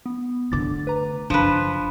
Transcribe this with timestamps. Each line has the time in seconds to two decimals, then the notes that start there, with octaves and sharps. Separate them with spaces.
0.06 B3
0.52 D3 A3 D6 A6
0.87 B4 A#5
1.30 F#1 F3 D4 B4